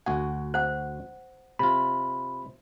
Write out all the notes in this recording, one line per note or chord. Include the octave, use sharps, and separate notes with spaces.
D2 F#4 F#5 G#5
C5 F#5
C3 F4 B5